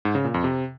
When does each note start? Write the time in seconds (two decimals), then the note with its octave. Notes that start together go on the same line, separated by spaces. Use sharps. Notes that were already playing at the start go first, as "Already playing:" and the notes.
0.05 G#2
0.15 C#3
0.24 A#2
0.34 F2
0.44 C3